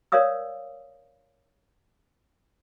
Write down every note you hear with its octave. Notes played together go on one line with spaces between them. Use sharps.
A#4 C#5 D5 F5 D#6 E6